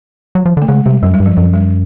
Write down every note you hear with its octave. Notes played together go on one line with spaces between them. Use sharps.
F#3
F3
D3
A3
C#3 G#3
C3 G3
F#2 F#3
G3
G2
F3
F#2 F3
G3